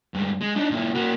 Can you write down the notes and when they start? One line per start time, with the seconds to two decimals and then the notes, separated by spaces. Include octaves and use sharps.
0.14 G2 G#3
0.41 G#3
0.55 D4 D#4
0.71 A#2 E4
0.95 A#3 F#4